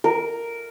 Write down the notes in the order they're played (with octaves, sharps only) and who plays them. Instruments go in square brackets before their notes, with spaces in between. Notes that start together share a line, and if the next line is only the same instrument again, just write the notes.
[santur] A#4